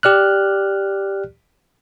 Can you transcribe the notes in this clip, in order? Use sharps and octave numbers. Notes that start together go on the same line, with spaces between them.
G4 D5 F6 F#6